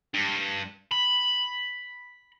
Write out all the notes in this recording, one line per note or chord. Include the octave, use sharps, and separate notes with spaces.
G2
B5